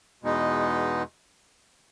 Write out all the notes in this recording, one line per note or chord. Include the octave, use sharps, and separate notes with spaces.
E2 B2 G#3 B3 D#4